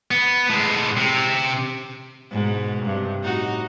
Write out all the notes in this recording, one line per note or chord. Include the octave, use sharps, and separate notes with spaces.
B3
A2 G#3
C3
G#2 B2
G2 C3
A2 D#4 F#4